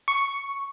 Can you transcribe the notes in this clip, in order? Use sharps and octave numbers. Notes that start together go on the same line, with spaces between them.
C#6